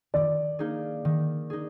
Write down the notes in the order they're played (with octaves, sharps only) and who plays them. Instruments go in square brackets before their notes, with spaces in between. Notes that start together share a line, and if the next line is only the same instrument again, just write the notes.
[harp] D#3 [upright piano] D5
[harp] A#3 D#4 G#4
D#3
D#4 G#4